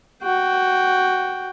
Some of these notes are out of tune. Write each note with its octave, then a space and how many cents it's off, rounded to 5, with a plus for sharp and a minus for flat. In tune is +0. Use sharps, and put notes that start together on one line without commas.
F#4 +10 G5 +0